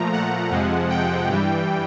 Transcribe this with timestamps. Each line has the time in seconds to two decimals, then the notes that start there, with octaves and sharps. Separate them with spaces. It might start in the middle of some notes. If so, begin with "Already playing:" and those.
Already playing: A#2 F3 A3 A#5
0.13 F#5
0.51 F2 C3 F3 G#3
0.90 G5
1.28 G2 E3 G3